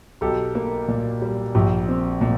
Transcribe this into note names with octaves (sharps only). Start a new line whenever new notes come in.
B1 G4 A4
A#3
A#2
G3
A#1 G4
C4
A#2